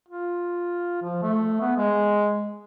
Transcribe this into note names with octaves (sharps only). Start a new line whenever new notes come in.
F4
F3
A3
B3
G#3